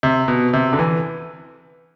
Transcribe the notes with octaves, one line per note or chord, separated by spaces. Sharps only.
C3
B2
C3
D3
E3